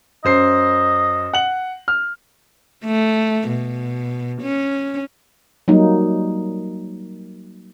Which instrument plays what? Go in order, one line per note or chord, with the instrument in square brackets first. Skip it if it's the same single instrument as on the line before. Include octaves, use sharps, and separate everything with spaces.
[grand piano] F#2 C5 C7 [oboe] D#5
[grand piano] F#5 F#7
F6
[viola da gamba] A3
B2
C#4
[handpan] F#3 G3 A#3 D#4